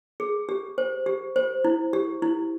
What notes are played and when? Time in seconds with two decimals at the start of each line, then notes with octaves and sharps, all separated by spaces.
0.20 G#4
0.49 G4
0.78 C5
1.06 G4
1.36 C5
1.65 E4
1.93 G4
2.22 E4